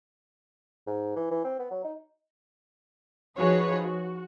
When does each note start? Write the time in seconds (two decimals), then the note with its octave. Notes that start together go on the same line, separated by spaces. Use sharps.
0.87 G#2
1.16 E3
1.31 E3
1.44 C4
1.59 B3
1.71 F#3
1.84 D#4
3.38 F3 D#4 F#4 G#4 B4 C#5
3.81 F#4